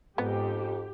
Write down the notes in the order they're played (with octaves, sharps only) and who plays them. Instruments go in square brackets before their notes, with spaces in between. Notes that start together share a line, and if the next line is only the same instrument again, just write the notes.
[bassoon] F2 [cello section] G#2 [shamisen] B3 [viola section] G4